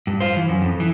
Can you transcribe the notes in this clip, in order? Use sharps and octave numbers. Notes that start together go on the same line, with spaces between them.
G2
F4 C5
E3
F#2
F2
E3